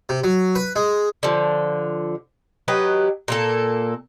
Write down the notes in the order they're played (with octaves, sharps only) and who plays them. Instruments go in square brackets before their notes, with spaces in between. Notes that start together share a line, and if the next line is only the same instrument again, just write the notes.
[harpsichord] C3
F#3
B4
G#3
[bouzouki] D3 F3
F#3 G4 B4 D#5
A#2 A#3 A4